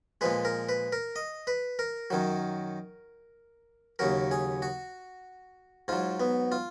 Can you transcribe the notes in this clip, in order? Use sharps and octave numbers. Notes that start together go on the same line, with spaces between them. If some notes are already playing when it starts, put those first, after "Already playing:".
A#2 F3 G#3 B4
A#4
B4
A#4
D#5
B4
A#4
F#2 D#3 F#3
D#2 C#3 F#3 A#4
G#4
F#4
G#2 F#3 F4
B3
F4